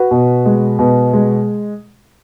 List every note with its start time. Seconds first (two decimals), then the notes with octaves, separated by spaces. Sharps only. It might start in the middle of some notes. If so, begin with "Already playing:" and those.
Already playing: F#4 B4
0.11 B2
0.46 G#3
0.79 B2
1.13 G#3